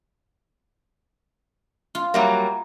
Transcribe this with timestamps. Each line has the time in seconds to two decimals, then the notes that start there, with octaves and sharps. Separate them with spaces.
1.95 F4
2.14 F#3 G3 A#3 E5 F#5 A#5